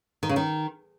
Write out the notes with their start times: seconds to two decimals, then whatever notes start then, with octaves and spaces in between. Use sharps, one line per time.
0.23 D#3
0.29 C#3
0.36 D#3